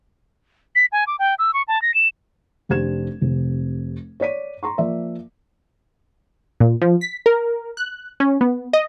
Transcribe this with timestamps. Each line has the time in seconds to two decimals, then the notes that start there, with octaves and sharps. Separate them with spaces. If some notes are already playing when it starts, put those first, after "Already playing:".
0.75 B6
0.92 G#5
1.07 D6
1.19 G5
1.39 E6
1.53 C#6
1.68 A5
1.82 A#6
1.94 E7
2.69 F1 D4 G4 C5 G#6 E7
3.21 F1 C3
4.20 C#5 D5 B6 D#7
4.63 A#5 C6 C#6
4.78 F3 A#3 A#4 D5 E5
6.60 A#2
6.82 F3
7.01 B6
7.26 A#4
7.77 F#6
8.20 C#4
8.41 B3
8.73 D#5